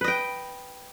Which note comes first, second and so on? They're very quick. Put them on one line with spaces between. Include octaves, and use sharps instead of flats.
B4 D#5 G5